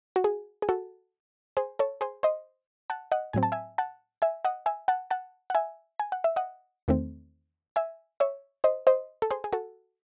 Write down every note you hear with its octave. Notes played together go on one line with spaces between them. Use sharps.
F#4
G#4
G#4
F#4 A4
G#4 C5
A4 C#5
G#4 C5
C5 D#5
F#5 A5
D#5 F#5
A2 F#3 C4 G#5
A5
E5 G#5
F#5 A5
E5 G#5
D#5 F#5
E5 G#5
F#5 A5
F#5 A5
F#5
E5 G#5
G#5
F#5
E5
D#5 F#5
E2 D#3 A3 C4
E5 G#5
C#5 E5
C5 D#5
C5 D#5
A4
G#4 C5
G#4
F#4 A4